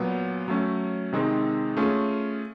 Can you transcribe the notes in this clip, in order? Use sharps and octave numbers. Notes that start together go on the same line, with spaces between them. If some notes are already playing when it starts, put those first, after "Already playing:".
Already playing: A#2 F#3 B3
F#3 A3 C#4
C3 D#3 G#3 C4 D#4
A3 C#4 F4 G#4